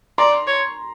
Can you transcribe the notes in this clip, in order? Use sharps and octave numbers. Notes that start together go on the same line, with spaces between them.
D5 A#5 C6
C#5